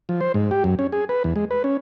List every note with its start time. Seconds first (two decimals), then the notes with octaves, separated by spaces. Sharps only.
0.09 F3
0.21 C5
0.34 G#2
0.51 G4
0.64 F#2
0.79 C#4
0.92 G#4
1.09 B4
1.24 E2
1.36 G#3
1.51 B4
1.64 C#4